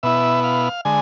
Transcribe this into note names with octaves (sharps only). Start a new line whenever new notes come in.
B2 B3 E4 E5
F5
D3 G#3 G#5